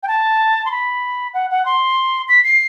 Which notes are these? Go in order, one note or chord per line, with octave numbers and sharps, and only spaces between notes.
G5
A5
C6
B5
F#5
F#5
C6
B6
C7